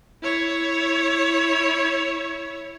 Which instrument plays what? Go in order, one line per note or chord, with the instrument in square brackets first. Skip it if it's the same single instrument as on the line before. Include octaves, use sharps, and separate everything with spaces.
[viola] E4 C#5